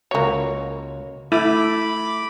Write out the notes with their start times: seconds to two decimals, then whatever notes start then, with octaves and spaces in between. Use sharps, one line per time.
0.11 C#2 F#3 A#3 C#5
1.32 A3 E4 B5 D6